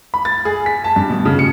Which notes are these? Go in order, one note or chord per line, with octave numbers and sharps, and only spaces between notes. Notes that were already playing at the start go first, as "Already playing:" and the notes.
B5
A6
G#4
B6
A5
G2
B2
C#3
C#7